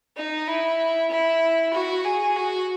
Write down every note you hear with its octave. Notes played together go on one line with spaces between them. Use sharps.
D#4
E4
E4
F#4
G#4
F#4